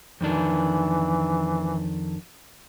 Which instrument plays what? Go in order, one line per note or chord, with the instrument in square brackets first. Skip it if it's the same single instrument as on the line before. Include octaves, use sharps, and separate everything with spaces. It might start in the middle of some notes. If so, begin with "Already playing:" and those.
[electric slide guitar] F2 D#3 D4 [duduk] E3